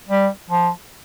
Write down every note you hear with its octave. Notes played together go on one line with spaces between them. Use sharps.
G3
F3